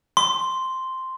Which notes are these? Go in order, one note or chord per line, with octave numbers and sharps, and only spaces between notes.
C6